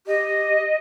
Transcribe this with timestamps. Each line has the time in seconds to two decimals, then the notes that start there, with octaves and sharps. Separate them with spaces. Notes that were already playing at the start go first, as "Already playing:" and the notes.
0.07 G4 D#5